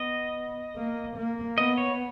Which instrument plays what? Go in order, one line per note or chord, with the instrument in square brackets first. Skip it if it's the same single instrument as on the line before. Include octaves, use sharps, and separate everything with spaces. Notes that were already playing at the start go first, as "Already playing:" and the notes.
Already playing: [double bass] B3 [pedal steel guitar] D#5
[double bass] A#3
A#3
[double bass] B3 [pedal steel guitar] D#5
[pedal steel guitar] C#5